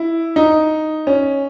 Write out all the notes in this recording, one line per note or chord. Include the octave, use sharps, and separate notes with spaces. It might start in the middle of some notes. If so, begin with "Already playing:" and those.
Already playing: E4
D#4
C#4